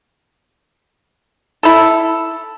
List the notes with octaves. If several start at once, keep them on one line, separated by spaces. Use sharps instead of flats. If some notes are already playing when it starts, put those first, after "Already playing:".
E4 A4